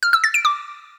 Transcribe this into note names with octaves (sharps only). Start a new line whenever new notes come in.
F6
E6
A6
D7
D6